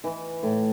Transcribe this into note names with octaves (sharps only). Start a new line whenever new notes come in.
E3
A2